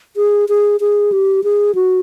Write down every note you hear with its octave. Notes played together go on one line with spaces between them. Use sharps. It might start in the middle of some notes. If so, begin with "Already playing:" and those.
G#4
G#4
G#4
G4
G#4
F#4